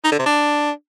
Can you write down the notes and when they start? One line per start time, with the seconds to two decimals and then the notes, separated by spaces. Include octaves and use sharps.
0.04 D#4
0.12 D3
0.19 C3
0.26 D4